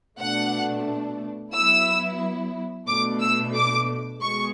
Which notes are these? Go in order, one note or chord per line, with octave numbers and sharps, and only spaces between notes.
B2 A3 D4 F#5
F#3 B3 E4 E6
B2 A3 D4 D6
E6
D6
B2 G#3 C#6